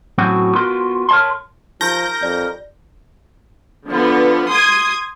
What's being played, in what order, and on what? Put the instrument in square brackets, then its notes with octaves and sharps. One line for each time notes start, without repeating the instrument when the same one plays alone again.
[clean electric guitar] A2 F#3 C4 C#4 F#4
B3 F4 F#4 A#4 C6
A#4 C#5 D5 A5 C6
[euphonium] F3 [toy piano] D#4 G4 [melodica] A#4 [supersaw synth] G6 A#6
[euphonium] F2 [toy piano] D5
[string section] D3 F3 B3
C6 D#6 G#6